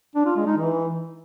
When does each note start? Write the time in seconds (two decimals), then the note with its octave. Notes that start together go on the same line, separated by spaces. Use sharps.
0.15 D4
0.26 F4
0.36 G#3
0.47 D#4
0.57 E3